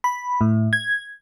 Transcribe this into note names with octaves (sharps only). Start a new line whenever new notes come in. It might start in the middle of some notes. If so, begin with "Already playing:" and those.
B5
A2
G#6